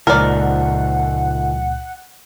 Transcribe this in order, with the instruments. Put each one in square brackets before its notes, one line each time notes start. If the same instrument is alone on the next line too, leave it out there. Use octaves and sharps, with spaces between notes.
[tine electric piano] C#2 A#2 [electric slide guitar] C#3 F3 D#4 [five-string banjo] A#4 D5 [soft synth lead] F#5